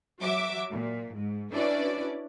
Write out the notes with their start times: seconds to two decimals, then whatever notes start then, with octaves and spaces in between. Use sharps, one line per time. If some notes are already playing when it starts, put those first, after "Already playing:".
0.21 F#3 F#4 E5 D6
0.72 A#2
1.15 G#2
1.53 C#4 D4 E4 F#4 B4 D5